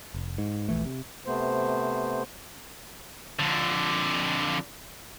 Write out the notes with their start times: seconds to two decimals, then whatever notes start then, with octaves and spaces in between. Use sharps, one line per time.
0.14 F1
0.38 G#2
0.69 D#1 A#1 E3 A3
0.86 C3
1.26 C3 A3 B3 C5
3.39 F2 D3